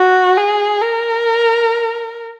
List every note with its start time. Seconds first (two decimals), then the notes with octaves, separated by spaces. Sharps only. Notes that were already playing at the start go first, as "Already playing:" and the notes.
Already playing: F#4
0.37 G#4
0.82 A#4